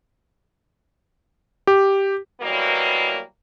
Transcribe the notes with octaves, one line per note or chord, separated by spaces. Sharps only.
G4
B2 E3 F#3 G3 A#3